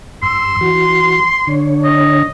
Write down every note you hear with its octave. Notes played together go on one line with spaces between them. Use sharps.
G2 C6 E6
E3 F#4
D3 D4 C#5
D#5